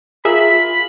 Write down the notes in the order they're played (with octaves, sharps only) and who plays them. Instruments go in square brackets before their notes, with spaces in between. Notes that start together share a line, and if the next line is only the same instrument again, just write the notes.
[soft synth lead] F4 [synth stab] G#4 A#4 E5 [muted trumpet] B5